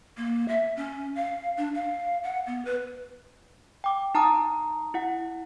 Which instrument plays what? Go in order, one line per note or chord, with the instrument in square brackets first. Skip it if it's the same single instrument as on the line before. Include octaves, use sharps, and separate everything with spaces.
[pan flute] A#3
E5
C#4
F5
D4
F5
F#5
B3
B4
[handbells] G5 D6
D#4 A5 A#5 D#6
E4 F#5